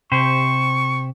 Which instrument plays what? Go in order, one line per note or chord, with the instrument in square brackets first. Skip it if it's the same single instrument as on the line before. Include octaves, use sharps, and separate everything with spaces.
[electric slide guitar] C3 G4 C5 [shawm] C#6